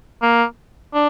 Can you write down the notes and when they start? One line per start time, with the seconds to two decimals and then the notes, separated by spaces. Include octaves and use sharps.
0.22 A#3
0.94 D4